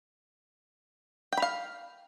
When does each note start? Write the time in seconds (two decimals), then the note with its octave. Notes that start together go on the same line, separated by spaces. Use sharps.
1.33 G5
1.37 B5
1.42 F5